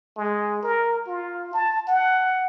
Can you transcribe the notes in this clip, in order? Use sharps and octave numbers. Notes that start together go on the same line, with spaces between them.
G#3
A#4
F4
A5
F#5